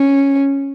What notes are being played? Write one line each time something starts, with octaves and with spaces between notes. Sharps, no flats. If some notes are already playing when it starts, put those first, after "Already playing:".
Already playing: C#4